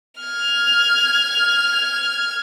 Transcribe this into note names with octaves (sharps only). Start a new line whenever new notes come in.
F6 G#6